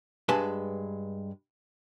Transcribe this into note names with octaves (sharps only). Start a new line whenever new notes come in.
G2 G#3 B4 G#5 A5 C6